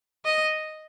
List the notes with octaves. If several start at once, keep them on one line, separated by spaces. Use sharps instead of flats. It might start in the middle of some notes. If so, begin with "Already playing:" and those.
D#5